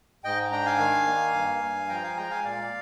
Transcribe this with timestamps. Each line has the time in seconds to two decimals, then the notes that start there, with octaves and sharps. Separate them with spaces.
0.24 G#2 D#5 G5
0.52 D4 G5 A#5
0.66 F5 G#5
0.79 D#3
1.07 A#3
1.34 G2
1.61 G2
1.89 F3 G5 A#5
2.03 F5 G#5
2.17 G#3 G5 A#5
2.30 F5 G#5
2.44 A#2 D5 F5